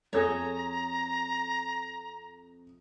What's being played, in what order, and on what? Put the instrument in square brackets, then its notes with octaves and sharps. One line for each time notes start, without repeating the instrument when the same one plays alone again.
[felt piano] F2 G#6 A#6 [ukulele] G#4 A4 C#5 [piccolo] A#5